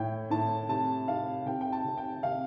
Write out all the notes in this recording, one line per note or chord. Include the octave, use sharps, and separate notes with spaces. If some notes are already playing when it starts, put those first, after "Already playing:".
Already playing: A2 G5
A2 A5
C3 A5
C3 F5
C3 G5
G5
A5
C3
G5
C3 F5